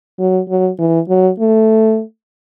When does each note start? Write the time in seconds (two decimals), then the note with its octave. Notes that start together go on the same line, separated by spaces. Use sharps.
0.19 F#3
0.49 F#3
0.79 E3
1.09 F#3
1.39 A3